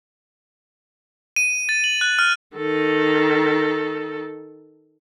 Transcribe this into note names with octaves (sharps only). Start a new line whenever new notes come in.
D#7
A6
F#7
F#6
F6
D#3 A4